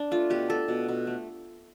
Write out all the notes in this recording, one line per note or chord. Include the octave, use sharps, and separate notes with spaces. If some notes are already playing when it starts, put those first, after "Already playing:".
Already playing: D4
A3 F4
B2 G4
A3 A4
B2
B2
A3